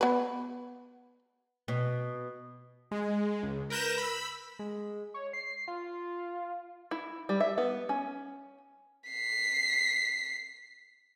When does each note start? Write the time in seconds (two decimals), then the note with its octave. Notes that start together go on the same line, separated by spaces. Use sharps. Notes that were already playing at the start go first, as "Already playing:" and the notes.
0.01 B3 B4
1.68 B2
2.91 G#3
3.43 C#2
3.70 A#4 B4 G6 A#6 E7
3.98 B5 E6
4.59 G#3
5.14 C#5
5.33 C7
5.68 F4
6.91 E4
7.29 G3
7.40 E5
7.58 B3
7.89 C#4
9.10 B6 C7